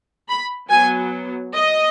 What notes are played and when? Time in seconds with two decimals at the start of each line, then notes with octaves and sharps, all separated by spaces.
0.29 B5
0.70 F#3 B3 G#5
1.54 D#5